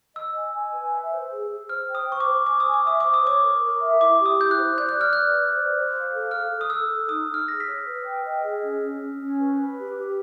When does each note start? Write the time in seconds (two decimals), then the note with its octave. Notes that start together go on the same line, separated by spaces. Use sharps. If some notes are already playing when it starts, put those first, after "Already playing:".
0.15 D#5 E6
0.34 G#5
0.54 G#5
0.73 B4
0.92 E5
1.12 C5
1.31 G#4
1.50 G#4
1.69 C5 F6
1.89 G5
1.95 D#6
2.08 C5 C#6
2.20 D6
2.27 C5
2.46 G#5 D6
2.60 D#6
2.66 G#5
2.74 D6
2.85 E5 D#6
3.00 C5 D6
3.14 D#6
3.23 C#5 D6
3.43 A#4
3.62 A#4
3.81 E5
4.00 E4 D6
4.20 G4
4.26 D#6
4.39 E4 G6
4.51 F#6
4.58 C5
4.77 D5 G6
4.89 F#6
4.97 D5 F6
5.13 B4 F#6
5.35 D5
5.55 C5
5.74 C5
5.92 F5
6.12 A4
6.31 A4 F6
6.50 A4
6.61 D#6
6.70 A4 E6
6.89 A4
7.09 D#4 D#6
7.27 D#4
7.34 F6
7.47 G#4 A#6
7.60 B6
7.66 C#5
7.86 B4
8.05 G5
8.24 D#5
8.43 G#4
8.63 C#4
8.81 C#4
9.01 C#4
9.20 C#4
9.39 B4
9.59 B4
9.77 G4
9.97 G4